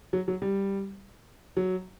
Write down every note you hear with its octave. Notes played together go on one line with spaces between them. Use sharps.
F#3
F#3
G3
F#3